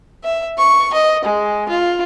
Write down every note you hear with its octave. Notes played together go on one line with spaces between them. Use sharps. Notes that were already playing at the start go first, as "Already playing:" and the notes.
E5
C#6
D#5
G#3
F4